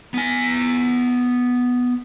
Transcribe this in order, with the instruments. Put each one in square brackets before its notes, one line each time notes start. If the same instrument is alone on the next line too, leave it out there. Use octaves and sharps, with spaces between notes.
[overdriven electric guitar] B3 G#5